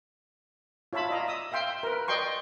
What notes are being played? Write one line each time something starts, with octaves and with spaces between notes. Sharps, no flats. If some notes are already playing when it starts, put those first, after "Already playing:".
F4 C#5 E5 A5 B5
D5 D#5 F5 A#5
D#6 E6
E5 F5 G5 C6
A#4 B4
D5 D#5 G5 C6 C#6